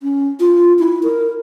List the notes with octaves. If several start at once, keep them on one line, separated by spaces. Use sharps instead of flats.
C#4
F4
E4
A#4